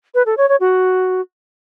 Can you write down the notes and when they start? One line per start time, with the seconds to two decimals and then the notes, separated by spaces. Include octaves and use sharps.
0.15 B4
0.26 A4
0.37 C#5
0.49 C#5
0.60 F#4